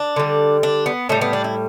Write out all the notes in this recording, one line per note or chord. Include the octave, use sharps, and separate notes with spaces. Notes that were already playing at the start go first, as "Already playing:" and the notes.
Already playing: D4
D3 G3
D4
B3
A2 G3 A3
B3
D4
E4